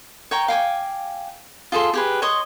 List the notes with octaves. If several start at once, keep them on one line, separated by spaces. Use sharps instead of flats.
C#5 G5 A#5
F5 G5 G#5 D6
F4 G#4 A4 C6
G4 G#4 B4
C#5 D#5 C6 D#6